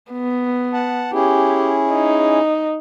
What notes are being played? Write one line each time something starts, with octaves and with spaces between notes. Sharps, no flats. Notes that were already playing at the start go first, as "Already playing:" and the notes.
B3
F#5 A5
C#4 E4 G4 G#4
D#4